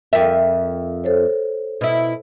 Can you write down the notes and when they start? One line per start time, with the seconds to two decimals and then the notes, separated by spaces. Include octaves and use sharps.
0.13 F2 A#4 E5 G5
1.04 A4 C5 C#5
1.81 B2 E4